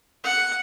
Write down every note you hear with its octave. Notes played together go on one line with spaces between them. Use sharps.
F#5